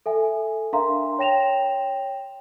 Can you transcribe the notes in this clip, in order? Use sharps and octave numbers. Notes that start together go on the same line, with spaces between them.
A4 E5 G#5
D4 A#4 E5 F5 A#5 C6
C#5 G5 A#6 E7 F7